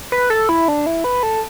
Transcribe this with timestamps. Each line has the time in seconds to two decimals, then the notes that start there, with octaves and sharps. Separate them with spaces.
0.12 B4
0.30 A4
0.49 E4
0.68 D4
0.86 E4
1.04 B4
1.23 A4